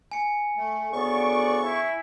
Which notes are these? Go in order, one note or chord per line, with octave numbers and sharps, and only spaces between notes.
G#5 C#7
A3
D2 C#3 B3 D5 C#6
E4